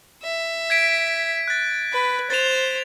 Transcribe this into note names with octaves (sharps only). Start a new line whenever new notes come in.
E5
G#6 B6 D7
F#6 A6
B4
C5 A6 F7